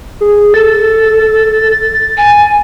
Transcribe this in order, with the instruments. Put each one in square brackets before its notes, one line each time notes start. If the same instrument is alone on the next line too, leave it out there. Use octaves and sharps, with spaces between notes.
[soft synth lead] G#4
[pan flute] A4 [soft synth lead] A6
[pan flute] G#5